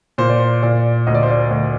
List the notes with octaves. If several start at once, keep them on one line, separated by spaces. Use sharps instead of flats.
A#2 C5
D5
C5
A#2 D5
D2 D#5
D5
C5
D5
D2